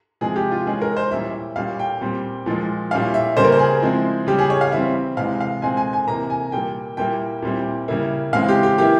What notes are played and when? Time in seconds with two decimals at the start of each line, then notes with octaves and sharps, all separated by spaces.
0.21 C3 F3 G#3 G#4
0.36 G4
0.51 F4
0.66 E3 G#3 C#4 G#4
0.81 A#4
0.97 C5
1.11 A#2 G3 C#4 E4 E5
1.56 A#2 G3 C#4 F5
1.79 G5
2.01 A#2 G3 C4
2.46 A#2 F3 G#3
2.91 A#2 G3 C#4 E4 F5
3.14 E5
3.37 C#3 G3 A#3 C5
3.45 A#4
3.52 C5
3.59 G#4
3.82 F3 G#3 C4 E4
4.27 C#3 G3 C#4 G4
4.39 G#4
4.50 C#5
4.61 F5
4.72 E3 G3 C4 E5
5.17 C3 E3 G#3 F5
5.40 F5
5.62 A#2 G#3 C4 G#5
5.77 G#5
5.93 G#5
6.08 C3 E3 A#3 A#5
6.30 G#5
6.52 A#2 G3 A#3 G5
6.97 A#2 G3 A#3 E4 G5
7.42 A#2 G3 C4 E4
7.88 C#3 G3 A#3 E4
8.33 C#3 E3 G#3 C4 E4 F5
8.48 G4
8.63 G4
8.78 E3 A#3 E4 G4